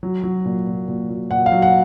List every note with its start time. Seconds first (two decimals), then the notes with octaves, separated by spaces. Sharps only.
0.03 F#3
0.23 F#3
0.45 A#2
0.67 A#2
0.88 A#2
1.09 F#3
1.31 A#2 F#5
1.46 F5
1.52 F#3
1.62 F#5